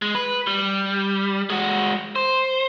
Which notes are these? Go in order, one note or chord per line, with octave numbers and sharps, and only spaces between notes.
G#3
B4
G3
G#3 F#4
C5